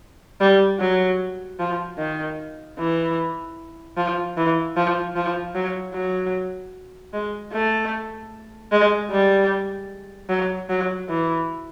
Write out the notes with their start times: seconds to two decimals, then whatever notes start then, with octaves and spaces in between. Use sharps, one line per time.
0.40 G3
0.80 F#3
1.60 F3
1.98 D#3
2.79 E3
3.97 F3
4.37 E3
4.76 F3
5.16 F3
5.55 F#3
5.94 F#3
7.13 G#3
7.52 A3
8.72 G#3
9.11 G3
10.29 F#3
10.69 F#3
11.09 E3